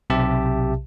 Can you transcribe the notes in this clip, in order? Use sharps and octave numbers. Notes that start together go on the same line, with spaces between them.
B1 C3 G4 E5 A5